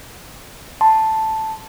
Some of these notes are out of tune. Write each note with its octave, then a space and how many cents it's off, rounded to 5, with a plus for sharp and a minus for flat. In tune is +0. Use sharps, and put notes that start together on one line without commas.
A5 +0 C6 -5